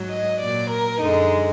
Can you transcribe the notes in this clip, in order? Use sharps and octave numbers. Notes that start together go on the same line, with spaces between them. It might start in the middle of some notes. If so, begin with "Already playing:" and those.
Already playing: G#2 F#3
D#5
A#2 F#3 D5
A#4
F#2 D3 G#3 D#4